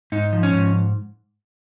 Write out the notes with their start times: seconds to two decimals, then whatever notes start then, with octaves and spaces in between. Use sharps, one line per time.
0.12 G#2 D#4
0.33 F3
0.43 C#4
0.53 G#2